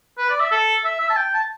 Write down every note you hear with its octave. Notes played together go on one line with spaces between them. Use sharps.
B4
D5
E5
A4
E5
E5
A5
G5
A5